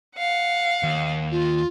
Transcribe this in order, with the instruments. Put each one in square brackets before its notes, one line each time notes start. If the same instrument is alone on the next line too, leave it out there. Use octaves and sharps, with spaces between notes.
[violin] F5 F#5
[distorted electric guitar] D#2
[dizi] F4